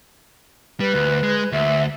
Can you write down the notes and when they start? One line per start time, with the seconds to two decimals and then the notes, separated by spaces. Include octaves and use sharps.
0.80 G3 B4
0.94 D2
1.23 G#3
1.52 D2 E5